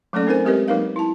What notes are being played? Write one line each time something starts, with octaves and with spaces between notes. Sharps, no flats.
F#3 A3 A#3 C#4 A4 D5
C4 D#4 A#4 C5 G#5
G#3 C4 G4 A#4 B4 D#5
F#3 A#3 D#4 A#4 B4 F5
E4 A5